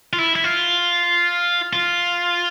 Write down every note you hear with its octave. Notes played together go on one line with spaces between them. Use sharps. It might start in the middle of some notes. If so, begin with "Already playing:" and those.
F4
E4
E4
F4
F4